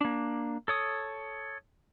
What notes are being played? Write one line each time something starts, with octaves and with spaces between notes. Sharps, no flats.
A#3 D4
A4 C#5 D#6